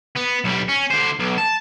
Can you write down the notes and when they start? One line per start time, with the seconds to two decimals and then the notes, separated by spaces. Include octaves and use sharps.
0.16 B3
0.44 B1 G3
0.68 C#4
0.90 D3 C5
1.19 B1
1.38 A5